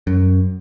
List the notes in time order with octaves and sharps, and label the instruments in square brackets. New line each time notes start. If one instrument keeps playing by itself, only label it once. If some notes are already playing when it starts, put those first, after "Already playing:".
[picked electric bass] F#2